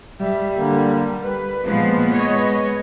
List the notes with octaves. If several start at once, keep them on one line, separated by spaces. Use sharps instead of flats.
G3 E5
D3 A#3
B4
A#2 F3 G#3 B3
C#5 D#5